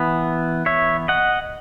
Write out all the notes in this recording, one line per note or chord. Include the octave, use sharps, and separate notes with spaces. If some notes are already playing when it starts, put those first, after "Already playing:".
Already playing: E3 B3
C#5 E5
D#5 F#5